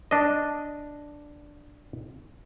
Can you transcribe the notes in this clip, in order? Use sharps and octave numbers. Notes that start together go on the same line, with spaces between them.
D4 D#5